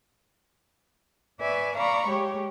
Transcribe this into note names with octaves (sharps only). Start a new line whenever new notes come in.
B4 D5 E5 G#5 C#6
D5 F5 A#5 B5 C#6
G#3 G4 C#5